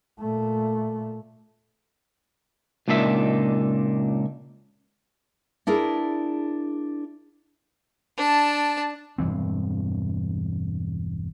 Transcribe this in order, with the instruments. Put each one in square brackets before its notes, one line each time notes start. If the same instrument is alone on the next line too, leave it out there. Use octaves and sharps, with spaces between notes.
[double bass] A#2 A3
[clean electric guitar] C#2 A#2 D4 D#4 G#4 E5
[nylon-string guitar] D4 E4 G#4 A#4
[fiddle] D4 A5
[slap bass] E1 G2 E3 C4